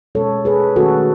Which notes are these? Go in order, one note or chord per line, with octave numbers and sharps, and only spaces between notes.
B2 G#3 C#4 A4 C#5
G#4 B4
D#3 A3 C#4 F#4 A4